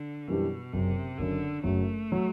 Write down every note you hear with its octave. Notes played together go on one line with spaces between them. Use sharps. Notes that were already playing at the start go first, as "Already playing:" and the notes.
Already playing: D3
F#2 B2 E3 G3 D4 G4
F#1 F#2 C3 F#3
F#1 F#2 D3 F#3
F#1 F#2 F#3 A3
F#3